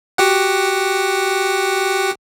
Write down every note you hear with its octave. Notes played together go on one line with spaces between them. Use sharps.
F#4 G4 F#5